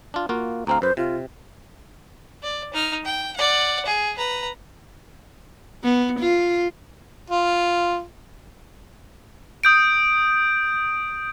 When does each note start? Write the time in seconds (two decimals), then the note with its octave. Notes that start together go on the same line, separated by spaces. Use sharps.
0.14 D4 F4
0.29 A#3 F4 F#4
0.67 D2 C4 F5 A#5
0.82 F#2 B4 C5
0.97 C3 F4
2.43 D5
2.74 D#4 F6
3.05 G5
3.36 D5 F#5
3.85 G#4
4.18 B4 A#5
5.84 B3
6.20 F4
7.30 F4
9.64 D#6 G6 D7